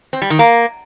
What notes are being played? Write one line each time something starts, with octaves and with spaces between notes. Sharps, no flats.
C4
G3
D#3
A#3